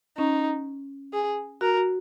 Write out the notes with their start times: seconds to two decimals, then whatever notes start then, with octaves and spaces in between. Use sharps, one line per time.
0.17 C#4 D#4
1.13 G#4
1.61 F#4 A#4
1.77 F#4